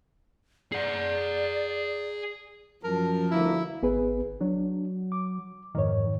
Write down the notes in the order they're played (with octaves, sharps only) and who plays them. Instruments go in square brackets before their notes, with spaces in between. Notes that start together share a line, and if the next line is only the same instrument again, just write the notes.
[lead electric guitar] G#4 F#5 [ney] D5
[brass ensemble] F#2 A5 [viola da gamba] F3 [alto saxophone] A#4
[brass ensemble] G1 D2 A#3 [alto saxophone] E4
[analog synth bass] G#1 [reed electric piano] B3 G#4 B4
[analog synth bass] F#3 [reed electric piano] D4
[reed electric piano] D6
[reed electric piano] F2 G#2 C#5 [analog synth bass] D#3